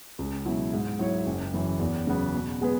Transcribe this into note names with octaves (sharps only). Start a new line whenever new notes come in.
C#2
B2 F#3 E4
G#2
F#3 E4 C#5
F#1
F#2 E3
E2
C#3 F#3 B3
B2
G#3 B3 G#4 B4